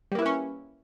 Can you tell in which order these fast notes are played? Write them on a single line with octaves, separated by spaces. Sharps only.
G3 A#3 E4 B4 C#4